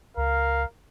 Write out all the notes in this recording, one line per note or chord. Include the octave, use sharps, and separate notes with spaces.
C#2 A#4 F5